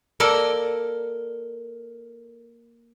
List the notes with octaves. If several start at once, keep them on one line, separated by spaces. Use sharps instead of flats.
A#3 A4 A#4 D5 D#5